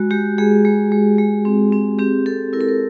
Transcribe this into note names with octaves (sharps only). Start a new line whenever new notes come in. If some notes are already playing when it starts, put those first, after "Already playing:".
Already playing: G#3 F#4
G#3 G4
G#3 G#4
G#3
G#3
G#3
C4
C4
C4 G4
C4 A4
E4 A#4
A4
A#4